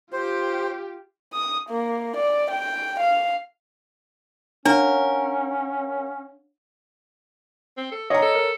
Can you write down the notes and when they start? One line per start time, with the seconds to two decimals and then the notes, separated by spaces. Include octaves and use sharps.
0.13 F4 G4 C5
1.33 D#6
1.69 A#3
2.16 D5
2.50 G5
3.00 F5
4.66 C#4 D4 A#4 C#5 F5 F#5
7.78 C4
7.92 A4
8.10 D3 C#5 D#5 A#5
8.22 A4
8.35 A#4